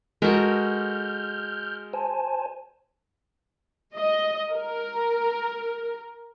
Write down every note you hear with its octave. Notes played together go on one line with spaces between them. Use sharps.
G#3 F#4 A4 A#4 F6 G6
C5 G#5 A5
D#5
A#4